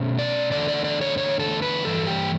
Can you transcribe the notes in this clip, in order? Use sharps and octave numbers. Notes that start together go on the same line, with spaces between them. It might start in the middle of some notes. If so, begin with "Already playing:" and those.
Already playing: B2 A3 C#4
D5
E2 D3 A3 D4 D5
D5
D5
C#5
C#5
A4
B4
G2 E3 A4
G4